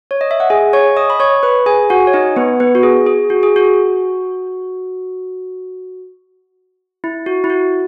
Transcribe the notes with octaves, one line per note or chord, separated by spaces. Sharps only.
C#5
D#5
E5
F#5
G#4 G#5
C#5 C#6
D#5 D#6
B5
C#5 C#6
B4 B5
G#4 G#5
F#4 F#5
C#5
D#4 D#5
B3 B4
B3 B4
F#4
G#4
G#4
F#4
G#4
F#4
E4
F#4
E4
F#4